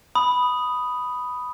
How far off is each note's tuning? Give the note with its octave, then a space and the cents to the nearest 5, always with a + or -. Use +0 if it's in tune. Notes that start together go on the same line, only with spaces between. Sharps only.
B5 +0 D#6 +0